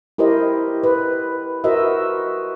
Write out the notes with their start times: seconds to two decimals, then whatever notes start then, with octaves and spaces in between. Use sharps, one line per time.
0.18 E4 G4 A#4 C5 D#5
0.84 B4
1.64 F#4 A#4 C5 D#5 E5